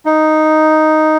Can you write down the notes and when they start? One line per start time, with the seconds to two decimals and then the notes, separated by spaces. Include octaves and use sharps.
0.06 D#4